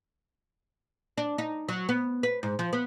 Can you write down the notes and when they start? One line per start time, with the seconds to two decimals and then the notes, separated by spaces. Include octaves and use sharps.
1.17 D4
1.38 D#4
1.68 F#3
1.89 B3
2.23 B4
2.43 G#2
2.59 F3
2.73 B3